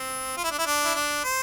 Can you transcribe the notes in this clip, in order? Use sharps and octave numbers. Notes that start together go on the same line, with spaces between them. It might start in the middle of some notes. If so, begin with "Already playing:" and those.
Already playing: C4
F4
E4
D4
E4
D4
E4
D4
C5